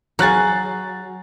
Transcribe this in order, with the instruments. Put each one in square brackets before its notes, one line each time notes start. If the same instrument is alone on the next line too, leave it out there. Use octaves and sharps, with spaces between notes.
[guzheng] F#3 [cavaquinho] G#4 F5 [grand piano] A#5 F#6 A6